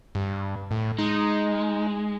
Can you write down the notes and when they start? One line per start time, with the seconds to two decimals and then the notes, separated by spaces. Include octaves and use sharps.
0.15 G2
0.71 A2
0.98 G#3 D#4